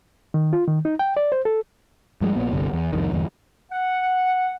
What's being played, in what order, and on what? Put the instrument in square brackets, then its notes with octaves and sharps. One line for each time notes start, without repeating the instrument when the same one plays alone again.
[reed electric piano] D#3
F4
D#3
D#4
G5
D5
C5
A4
[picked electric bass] G2 F3 G3 G#3
A#1 A#2 B3
G1 C2 G2 D3
E2
C2 F2 D#3
G1 E2
[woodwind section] F#5